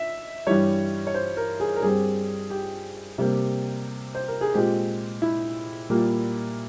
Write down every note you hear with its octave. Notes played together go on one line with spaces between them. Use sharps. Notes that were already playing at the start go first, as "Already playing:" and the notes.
Already playing: E5
G2 E3 G3 C#5
C#5
C5
A#4
G#4
A#4
G2 G3 C4 G#4
G4
C3 G3 A#3
C5
A#4
G#4
A#2 G#3 C4 G4
E4
A#2 G3 A#3